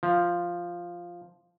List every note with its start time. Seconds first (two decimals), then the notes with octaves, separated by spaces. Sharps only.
0.03 F3